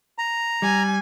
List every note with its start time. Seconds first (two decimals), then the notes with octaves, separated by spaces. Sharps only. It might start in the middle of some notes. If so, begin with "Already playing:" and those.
0.18 A#5
0.62 G3 G#5